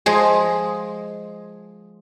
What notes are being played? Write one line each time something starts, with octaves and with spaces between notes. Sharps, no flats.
F3 G#3 G#4